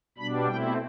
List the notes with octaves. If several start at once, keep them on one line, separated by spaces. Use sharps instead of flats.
B2 G3 D4 B5
B2 A3 C4 E4 G5